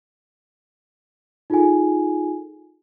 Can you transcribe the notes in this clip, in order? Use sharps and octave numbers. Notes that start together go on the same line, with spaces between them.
D#4 F4 G#4 A4 G#5